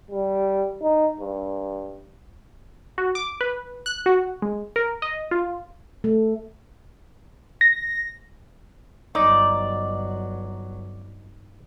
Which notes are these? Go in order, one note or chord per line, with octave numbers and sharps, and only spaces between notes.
G3
D#4
G2
F#4
D6
B4
F#6
F#4
G#3
A#4
D#5
F4
A3
A#6
G1 F#3 D#4 D5